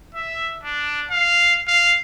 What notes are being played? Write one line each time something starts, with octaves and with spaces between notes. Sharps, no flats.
E5
D4
F5
F5